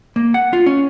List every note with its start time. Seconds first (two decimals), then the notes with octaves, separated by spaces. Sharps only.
0.16 A#3
0.34 F#5
0.53 F4
0.66 C#4